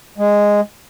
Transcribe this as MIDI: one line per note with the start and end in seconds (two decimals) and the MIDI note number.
0.18 0.61 56